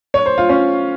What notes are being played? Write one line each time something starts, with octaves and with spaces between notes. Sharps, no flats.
C#5
C5
F4
C#4